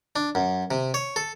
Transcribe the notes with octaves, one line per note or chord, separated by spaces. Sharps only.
D4
F#2
C3
C#5
A4